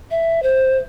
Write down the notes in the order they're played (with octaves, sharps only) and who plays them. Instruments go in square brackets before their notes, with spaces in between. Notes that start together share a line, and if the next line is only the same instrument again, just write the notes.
[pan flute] E5
C5